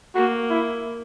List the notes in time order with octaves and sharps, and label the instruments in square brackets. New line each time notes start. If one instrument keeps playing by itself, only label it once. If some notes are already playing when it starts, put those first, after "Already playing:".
[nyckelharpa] A#3 [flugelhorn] F#4
[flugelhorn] E4